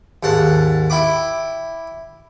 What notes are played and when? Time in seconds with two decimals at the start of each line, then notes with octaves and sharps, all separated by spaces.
0.23 D#2 G#2 F#5 A5
0.90 E4 G5 B5 D6